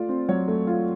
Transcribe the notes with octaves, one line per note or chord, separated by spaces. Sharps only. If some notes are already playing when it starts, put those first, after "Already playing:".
Already playing: A3 F4 D5
C4
F#3 C#5
A3
F4